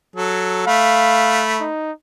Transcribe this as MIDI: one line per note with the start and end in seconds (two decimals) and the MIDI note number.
0.16 0.67 54
0.16 0.67 69
0.67 1.66 57
0.67 1.44 77
0.67 1.66 83
1.61 1.92 63